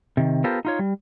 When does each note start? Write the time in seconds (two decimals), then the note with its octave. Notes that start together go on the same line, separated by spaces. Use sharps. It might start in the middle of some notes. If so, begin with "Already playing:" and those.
0.17 C3 D#3
0.44 B3 F4 G4 A4 A#4 C5
0.65 D#4 F4 C#5
0.79 G3